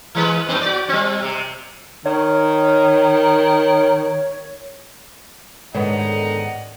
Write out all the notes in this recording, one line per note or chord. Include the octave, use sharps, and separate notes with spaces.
E3 G#3 B4
G2 B3
F#4 D5
G3 C4
C3
D#3 C#5
G#2 D3 D#3 B3 D#4 C#5 F#5